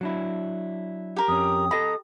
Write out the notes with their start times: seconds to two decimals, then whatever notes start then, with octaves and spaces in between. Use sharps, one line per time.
0.01 F#3 D4 E4
1.17 G4 A#4
1.28 F2 C#4 D#6
1.71 A4 D#5 A#5 B5